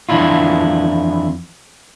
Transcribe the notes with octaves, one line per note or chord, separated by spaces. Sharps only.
F2 E3 D4 E4 F4